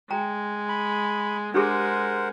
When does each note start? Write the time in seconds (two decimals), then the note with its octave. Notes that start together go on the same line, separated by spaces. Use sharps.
0.11 G#3 G5 A#5
0.69 B5
1.54 G#3 D4 G4 G#4 A#4 C5 F#5